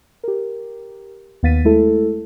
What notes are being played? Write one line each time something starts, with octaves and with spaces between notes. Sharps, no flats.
G4 A#4
D#2 B3 F5 A6 B6 D#7
G#3 A3 E4 A4